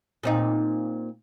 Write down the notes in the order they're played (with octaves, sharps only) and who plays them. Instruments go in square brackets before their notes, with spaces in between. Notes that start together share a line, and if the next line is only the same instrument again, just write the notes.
[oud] A#2 C4 D#4